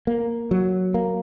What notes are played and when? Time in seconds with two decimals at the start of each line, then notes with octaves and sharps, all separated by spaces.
0.07 A#3
0.51 F#3
0.94 A#3